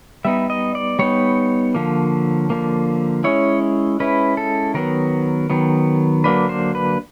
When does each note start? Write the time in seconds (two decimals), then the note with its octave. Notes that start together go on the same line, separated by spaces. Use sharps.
0.25 G3 B3 D#4 E5
0.50 D#5
0.75 D5
0.99 G3 B3 D#4 C#5
1.75 D3 F3 A#3
2.50 D3 F3 A#3
3.24 G#3 C#4 E4 C#5
4.00 G#3 C#4 E4 B4
4.37 A4
4.74 D#3 F#3 B3 A#4
5.50 D#3 F#3 B3
6.24 D3 F#3 A#3 D4 B4
6.49 C5
6.75 B4